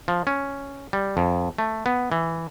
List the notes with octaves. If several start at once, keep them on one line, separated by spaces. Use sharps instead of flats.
F3
C#4
G3
F2
A3
B3
E3